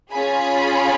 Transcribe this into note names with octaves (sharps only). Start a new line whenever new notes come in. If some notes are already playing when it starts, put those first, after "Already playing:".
C#4 F4 G#4 G#5 B5